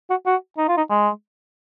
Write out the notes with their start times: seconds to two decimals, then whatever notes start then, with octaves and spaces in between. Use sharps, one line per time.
0.10 F#4
0.26 F#4
0.58 D#4
0.68 F4
0.77 D#4
0.90 G#3